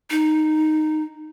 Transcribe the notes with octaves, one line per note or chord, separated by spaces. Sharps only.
D#4